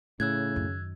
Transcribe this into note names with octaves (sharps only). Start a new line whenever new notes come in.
A2 C#3 E6 F#6 G#6
F#2 D#3